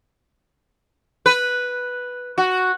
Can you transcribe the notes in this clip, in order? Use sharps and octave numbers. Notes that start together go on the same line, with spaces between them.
B4
F#4